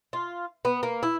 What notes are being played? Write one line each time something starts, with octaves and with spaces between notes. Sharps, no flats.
F4
B3
A#3
E4